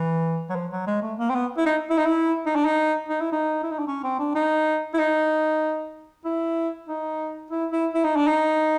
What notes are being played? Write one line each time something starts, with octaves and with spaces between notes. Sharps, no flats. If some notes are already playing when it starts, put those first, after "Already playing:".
Already playing: E3
F#3
F3
F#3
G#3
A3
A#3
C4
B3
E4
D#4
E4
D#4
E4
D#4
D4
D#4
D#4
E4
D#4
E4
D#4
D4
C#4
C4
D4
D#4
E4
D#4
E4
D#4
E4
E4
E4
D#4
D4
D#4